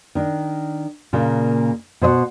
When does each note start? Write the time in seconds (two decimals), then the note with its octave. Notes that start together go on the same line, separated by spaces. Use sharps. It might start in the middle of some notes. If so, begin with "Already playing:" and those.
0.15 D#3 D4
1.13 A#2 C#3 A#3
2.02 B2 C5 D#5 F#5